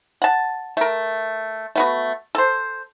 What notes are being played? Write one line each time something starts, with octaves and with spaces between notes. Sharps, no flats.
F#5 A5
A3 A#4
A3 B3 F#4
A4 C5